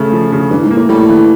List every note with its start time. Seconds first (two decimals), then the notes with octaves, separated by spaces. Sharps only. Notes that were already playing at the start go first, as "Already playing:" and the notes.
Already playing: C#3 A3
0.12 F3
0.32 C#3
0.51 G2 E3
0.63 G#2
0.71 A#3
0.76 A2
0.89 A2 G3
1.09 E3